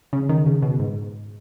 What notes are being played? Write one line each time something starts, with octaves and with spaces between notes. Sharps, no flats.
C#3
D#3
C#3
B2
G#2